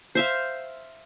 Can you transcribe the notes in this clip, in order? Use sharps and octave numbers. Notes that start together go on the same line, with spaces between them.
C5 E5 F5